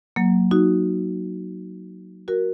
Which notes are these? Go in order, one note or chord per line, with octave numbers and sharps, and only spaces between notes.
F#3 A#3
D#4 F#4
F#4 A#4